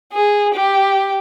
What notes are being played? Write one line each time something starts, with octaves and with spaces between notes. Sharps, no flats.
G#4
G4